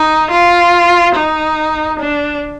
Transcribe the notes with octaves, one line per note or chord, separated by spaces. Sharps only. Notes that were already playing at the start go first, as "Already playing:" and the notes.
Already playing: D#4
F4
D#4
D4